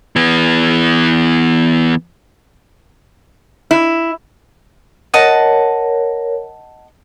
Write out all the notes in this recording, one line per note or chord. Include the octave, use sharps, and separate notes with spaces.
E3 B3
E4
A#4 C#5 D#5 F#5 A5